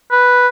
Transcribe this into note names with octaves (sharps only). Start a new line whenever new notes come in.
B4